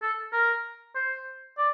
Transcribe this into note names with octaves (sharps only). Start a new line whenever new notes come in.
A4
A#4
C5
D5